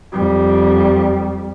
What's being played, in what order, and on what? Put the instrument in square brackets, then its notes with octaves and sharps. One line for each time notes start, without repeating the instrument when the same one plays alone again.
[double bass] F2 G3